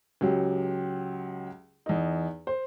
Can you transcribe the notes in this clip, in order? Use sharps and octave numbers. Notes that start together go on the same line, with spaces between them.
C#2 F#3 G4
E2 D#4
C5